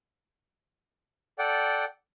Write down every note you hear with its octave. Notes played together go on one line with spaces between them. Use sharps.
A4 D5 F#5 G5